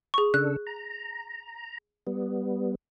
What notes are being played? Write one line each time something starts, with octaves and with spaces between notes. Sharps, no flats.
G#4 C#6
C#3 D4 A4 F#6
A#5
G3 B3